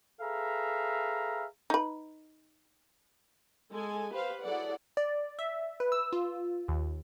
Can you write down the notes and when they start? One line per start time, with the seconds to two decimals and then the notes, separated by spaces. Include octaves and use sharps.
0.21 G#4 A4 B4 E5 F5 A#5
1.70 D#4 B4
3.70 G#3 A4 G#5
4.13 G4 B4 C5 F5
4.43 F#3 E4 G#4 A4 D5 F#5
4.97 D5
5.39 E5
5.80 B4
5.92 E6
6.13 F4
6.68 D#2